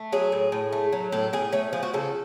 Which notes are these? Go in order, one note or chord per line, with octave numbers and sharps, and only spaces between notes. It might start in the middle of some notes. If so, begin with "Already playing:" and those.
Already playing: A3
F#3 G#4
A2
A2
A3
F#3
A2 A4
A2 G#4
A3 C#4
F3 G#4
F#4
C#3 A4